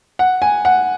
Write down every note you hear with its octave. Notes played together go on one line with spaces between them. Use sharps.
F#5
G#5
F#5